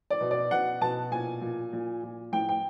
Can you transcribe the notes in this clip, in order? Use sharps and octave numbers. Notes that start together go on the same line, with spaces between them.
D5
B2
D5
B2 F#5
B2 A5
A#2 G#5
A#2
A#2
A#2
A2 G5
G5